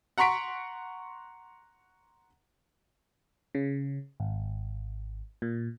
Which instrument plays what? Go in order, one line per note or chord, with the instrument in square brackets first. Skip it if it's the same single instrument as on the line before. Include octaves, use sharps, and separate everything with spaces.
[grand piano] F#5 A#5 C6 C#6 B6 D7
[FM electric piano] C#3
G#1
A#2